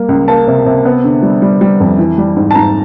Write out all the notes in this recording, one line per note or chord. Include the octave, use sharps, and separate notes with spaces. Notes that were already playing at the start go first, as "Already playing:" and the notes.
Already playing: G3 A#3
C#2
A#3 A5
C3
C3
B3
D3
G3
G3
G3
F2
E3
G3
G#2
A5
G#2 A#5